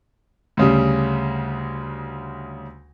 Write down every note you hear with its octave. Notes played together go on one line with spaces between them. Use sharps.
D2 C#3 G3